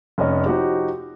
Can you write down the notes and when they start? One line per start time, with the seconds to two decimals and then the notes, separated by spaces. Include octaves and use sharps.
0.18 F1 C#4 D#5
0.46 F3 D#4 F#4 G4